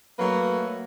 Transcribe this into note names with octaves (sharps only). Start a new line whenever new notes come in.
F#3 A3 A#3 B4